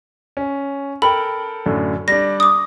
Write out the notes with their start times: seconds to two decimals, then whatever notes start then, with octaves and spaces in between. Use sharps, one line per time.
0.37 C#4
1.02 A4 A#4 G5 B5
1.66 F#2 A2 D3
2.08 G3 D4 A#6
2.40 D6 D#6